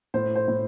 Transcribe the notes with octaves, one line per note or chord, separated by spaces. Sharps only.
A2 C5
C5
A2